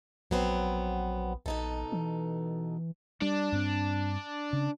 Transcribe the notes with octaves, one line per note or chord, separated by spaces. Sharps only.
A#1 F#3 B3 C4
A#1 B2 D#4 A4
E3
G3 D4
G2 C4
C#3